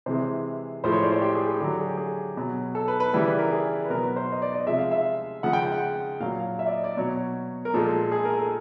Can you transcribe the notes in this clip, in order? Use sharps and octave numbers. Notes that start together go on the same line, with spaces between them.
C3 E3 G#3 C5
A2 F3 G#3 C5
C#5
D5
C5
G4
G#4
G#4
D3 F#3 G4
G#4
G4
G#4
B2 F#3
A4
B4
B4
C#3 E3 G3 B4
B4
A#4
G#4
B4
B2 F#3 A#4
B4
C5
D#5
D5
D#5
C3 F3 G#3 E5
F5
E5
C#3 F3 G#3 F#5
G5
G5
F#5
A#2 F#3 F5
F5
E5
D5
D#5
D5
B2 F#3 C#5
A#4
A#2 F3 G#3 A4
G#4
A#4
A4